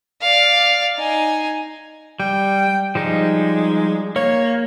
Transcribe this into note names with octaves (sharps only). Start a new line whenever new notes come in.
D5 F5
D#4 G#5
G3 G5
F3 G3 G#3 D#4
A#3 C#5